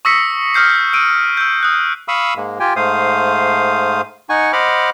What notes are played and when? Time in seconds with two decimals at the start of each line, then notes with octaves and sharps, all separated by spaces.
0.05 C#6 D#6 E6 A#6 B6 C#7
0.54 D#6 F6 G6 C7
0.93 E6 D7 D#7
1.37 E6 G6
1.63 D#6 F#6
2.08 F5 B5 C#6 D#6 E6
2.37 G#2 G#3 A#3
2.60 F4 G4 G5 G#5
2.76 G#2 A3 C5 F5 D#6
4.29 D#4 F#5 G#5 C#6
4.53 C5 D#5 F#5 B5 D6 F6